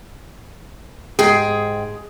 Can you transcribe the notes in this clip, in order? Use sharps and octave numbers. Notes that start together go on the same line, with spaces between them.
G#2 G#4 G5